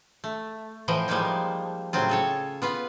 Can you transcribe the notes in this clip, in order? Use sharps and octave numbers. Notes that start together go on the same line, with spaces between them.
A3
A2 E3 F3 D#5 G5
F3 G3 G#3 A#3 D#4
A2 C#3 F#3 C4 F4
G#4 A4 C#5
B3 F4 B4